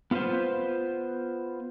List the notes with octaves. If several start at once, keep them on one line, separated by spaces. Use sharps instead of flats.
B3 F4 G4 B4 C5